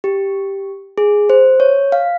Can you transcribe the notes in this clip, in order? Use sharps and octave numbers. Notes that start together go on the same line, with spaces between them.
G4
G#4
C5
C#5
F5